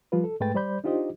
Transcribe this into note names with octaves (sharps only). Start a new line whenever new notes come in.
F3 G3 F4 B4
A4
G#2 G#3 A3 B4 G5 A6
G3 C5 D5 B5 G6
D4 D#4 F4 G4 C5 D#5